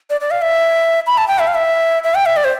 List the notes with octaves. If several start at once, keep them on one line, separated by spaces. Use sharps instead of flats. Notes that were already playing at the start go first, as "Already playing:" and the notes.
D5
D5
F5
E5
B5
A5
G5
E5
F5
E5
E5
G5
E5
D5
C5